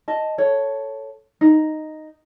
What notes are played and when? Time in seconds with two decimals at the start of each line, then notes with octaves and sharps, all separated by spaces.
0.08 D#5 A5
0.38 A4 C#5
1.41 D#4